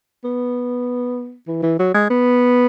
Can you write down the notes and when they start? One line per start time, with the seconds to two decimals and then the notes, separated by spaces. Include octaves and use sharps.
0.24 B3
1.47 E3
1.63 E3
1.79 F#3
1.94 G#3
2.10 B3